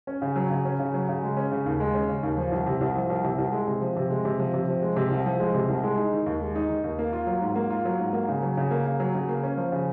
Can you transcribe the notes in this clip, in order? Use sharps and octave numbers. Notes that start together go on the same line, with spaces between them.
C#4
C#3
F#3
C#3
C#4
C#3
F#3
C#3
G#3
C#4
C#3
D#2
G#3
C#4
C#3
D#2
F3
C2
C3
C2
F3
C2
C3
C2
G#3
C3
F3
C3
G#3
C3
F3
C3
F3
G#3
C3
C2
F3
G#3
C3
C2
G#3
D#4
D#3
D#2
G#3
D#4
D#3
D#2
A#3
F4
F#3
G#2
A#3
F4
F#3
G#2
A#3
C#3
F#3
C#3
A#3
C#3
F#3
C#3
A#3
C#4
F3
C#3